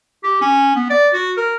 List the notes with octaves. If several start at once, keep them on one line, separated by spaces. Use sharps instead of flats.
G4
C#4
B3
D5
F#4
A#4